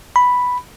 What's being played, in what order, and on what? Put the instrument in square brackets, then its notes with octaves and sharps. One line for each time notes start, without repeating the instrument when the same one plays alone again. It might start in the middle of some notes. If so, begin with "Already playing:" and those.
[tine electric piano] B5